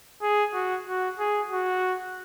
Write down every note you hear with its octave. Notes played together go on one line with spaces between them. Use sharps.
G#4
F#4
F#4
G#4
F#4